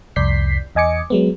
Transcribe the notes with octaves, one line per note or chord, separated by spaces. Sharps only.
C2 F2 D5 G6 B6 C7
E2 D#5 G#5 D6 C#7
F#3 G#3 B3